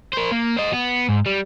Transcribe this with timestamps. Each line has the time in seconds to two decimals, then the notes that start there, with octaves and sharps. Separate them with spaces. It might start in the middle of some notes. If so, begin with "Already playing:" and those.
0.13 A#4 C5
0.32 A#3
0.57 C5 D#5
0.73 B3
1.09 G#2
1.26 G3